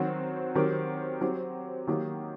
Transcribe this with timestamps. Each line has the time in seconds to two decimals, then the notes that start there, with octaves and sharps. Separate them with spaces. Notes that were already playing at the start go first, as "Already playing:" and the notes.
Already playing: D#3 F#3 C4 F#4
0.55 D#3 F#3 C4 G4 A#4
1.21 F#3 C4 G4
1.87 D#3 F#3 A#3 D#4 G4